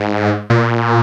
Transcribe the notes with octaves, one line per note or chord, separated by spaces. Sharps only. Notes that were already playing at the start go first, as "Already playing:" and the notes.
Already playing: G#2
A#2